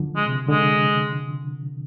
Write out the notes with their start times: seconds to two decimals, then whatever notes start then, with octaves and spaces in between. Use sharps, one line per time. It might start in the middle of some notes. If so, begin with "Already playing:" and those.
Already playing: D3 F3
0.16 G#3
0.26 C3
0.48 D3 G#3